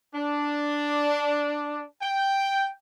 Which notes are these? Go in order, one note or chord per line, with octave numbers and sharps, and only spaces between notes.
D4
G5